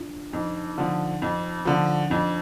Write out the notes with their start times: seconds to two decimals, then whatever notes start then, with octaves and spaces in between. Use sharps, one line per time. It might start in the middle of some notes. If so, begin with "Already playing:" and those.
Already playing: D4 F4
0.33 F2 D#4
0.78 D3 F3
1.22 F2
1.65 D3 F3
2.10 F2 D4